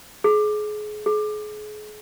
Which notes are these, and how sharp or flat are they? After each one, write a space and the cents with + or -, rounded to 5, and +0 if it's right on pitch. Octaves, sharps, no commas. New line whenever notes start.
G#4 +30
G#4 +35